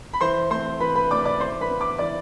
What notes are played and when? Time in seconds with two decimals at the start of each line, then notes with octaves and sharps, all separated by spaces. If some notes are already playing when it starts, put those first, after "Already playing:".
0.13 B5
0.21 E3 C5 C6
0.51 A3 C4 C5 C6
0.80 E3 B4 B5
0.96 B4 B5
1.11 A3 D5 D6
1.15 C4
1.25 D5 D6
1.40 E3 C5 C6
1.61 B4 B5
1.70 B3
1.81 D6
1.98 E3 D5 D6